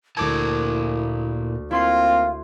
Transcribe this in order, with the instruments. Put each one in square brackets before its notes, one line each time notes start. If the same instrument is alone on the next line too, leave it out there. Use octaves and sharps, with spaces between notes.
[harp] D2 D6 G#6 [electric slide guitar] A#2 A#4 A5 [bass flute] E4
[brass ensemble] A#3 C4 F4 [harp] E4 C6 C7 [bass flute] F5